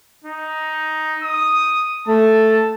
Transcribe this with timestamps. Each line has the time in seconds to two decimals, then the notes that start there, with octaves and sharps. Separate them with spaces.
0.24 D#4
1.23 D#6
2.08 A3 A5